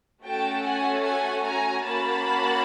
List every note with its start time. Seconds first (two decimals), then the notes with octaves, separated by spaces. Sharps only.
0.24 A3 C#4 F#4 A4 G5 A5
0.63 F#5 G#5
1.03 F#5 G#5
1.43 G#5 A#5
1.83 A#3 C#4 F#4 A5 B5